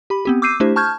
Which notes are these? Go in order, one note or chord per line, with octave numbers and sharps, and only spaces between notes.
G4 B5
B3 C4 G4
D6 E6 G6 C7 D#7
A3 D4 E4 G4 C5
A5 C#6 F6 G6 G#6